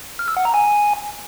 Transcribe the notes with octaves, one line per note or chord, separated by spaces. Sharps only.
F6
E6
F#5
A#5
G#5